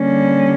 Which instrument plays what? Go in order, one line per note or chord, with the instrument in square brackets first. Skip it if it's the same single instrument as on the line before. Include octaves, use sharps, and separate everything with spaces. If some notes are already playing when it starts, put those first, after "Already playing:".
Already playing: [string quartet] D3 G3 A#3 C#4